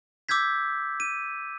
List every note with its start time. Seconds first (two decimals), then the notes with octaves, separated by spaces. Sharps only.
0.29 D6 E6 G6 G#6 B6
1.00 D#7